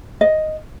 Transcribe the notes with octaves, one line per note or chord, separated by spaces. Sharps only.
D#5